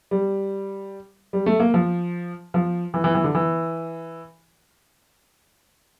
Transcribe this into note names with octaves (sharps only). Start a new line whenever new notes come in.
G3
G3
A3
A#3
F3
F3
E3
E3
E3
D3
E3